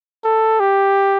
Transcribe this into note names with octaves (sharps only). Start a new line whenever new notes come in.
A4
G4